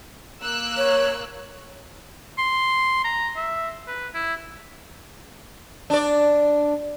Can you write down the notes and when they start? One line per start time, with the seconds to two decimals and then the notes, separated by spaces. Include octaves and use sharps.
0.43 A#3 E6 F#6
0.77 C#5
2.38 C6
3.04 A#5
3.36 E5
3.87 B4
4.14 E4
5.90 D4 D5